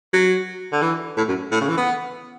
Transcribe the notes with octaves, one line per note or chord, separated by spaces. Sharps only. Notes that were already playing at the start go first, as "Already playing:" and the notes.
F#3
D3
E3
A2
F#2
A2
C#3
E3
B3